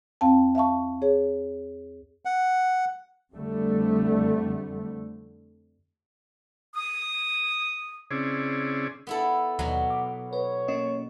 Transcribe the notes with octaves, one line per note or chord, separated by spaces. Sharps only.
E2 C4 F5 G5 A5
E5 F5 A5 C#6
G#4 C#5
F#5
F2 D3 G3 A3
D#6
C#3 C4 C#4 E4 G#4 D5
B3 E4 A4
D#2 B2 D#3 F#3 A#5
D6
B4 C#5
A#3 C#4 D#5